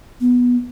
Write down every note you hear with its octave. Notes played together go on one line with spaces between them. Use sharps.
B3